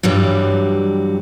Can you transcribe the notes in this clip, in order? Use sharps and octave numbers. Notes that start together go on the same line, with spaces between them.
G2 E3 F#3 G3